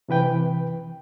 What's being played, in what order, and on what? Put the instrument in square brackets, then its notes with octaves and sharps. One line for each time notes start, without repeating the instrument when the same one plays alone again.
[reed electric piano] C3 E3 B4 G5